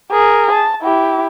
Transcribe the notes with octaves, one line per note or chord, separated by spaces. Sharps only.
G#4 A#4
A5
E4 G4